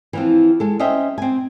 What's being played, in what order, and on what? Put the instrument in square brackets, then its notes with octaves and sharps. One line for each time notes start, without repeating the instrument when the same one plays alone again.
[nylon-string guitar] E3 F3 C4
G#3 A4
C#4 C5 D#5 E5 G5
C4 G#5